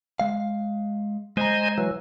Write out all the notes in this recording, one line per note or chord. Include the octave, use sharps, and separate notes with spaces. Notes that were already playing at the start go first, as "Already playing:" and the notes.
G#3 F5
G#3 C5 D#5 G#5 A#5
E3 F#3